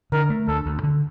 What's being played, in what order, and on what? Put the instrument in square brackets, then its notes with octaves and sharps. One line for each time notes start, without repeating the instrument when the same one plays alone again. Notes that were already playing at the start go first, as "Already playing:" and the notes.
[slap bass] D3 [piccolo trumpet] A#4
[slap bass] A3
[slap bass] D2 [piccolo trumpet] A4
[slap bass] D2
D3